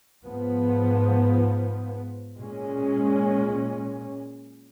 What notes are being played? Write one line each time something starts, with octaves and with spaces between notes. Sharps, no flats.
G#2 F3 B3
A#2 G#3 C#4